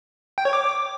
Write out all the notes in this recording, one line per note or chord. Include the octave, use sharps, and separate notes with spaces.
G5
C#5
D6